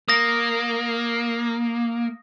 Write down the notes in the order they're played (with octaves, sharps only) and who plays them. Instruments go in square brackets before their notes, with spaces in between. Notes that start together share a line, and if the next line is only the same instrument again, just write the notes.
[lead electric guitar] A#3 [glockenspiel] D#6 A#6